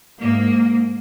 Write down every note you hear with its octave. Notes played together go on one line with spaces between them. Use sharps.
G#2 A#3